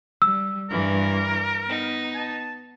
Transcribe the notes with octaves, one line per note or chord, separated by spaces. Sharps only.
G3 E6
G2 E3 A#4
B3 D#4
A5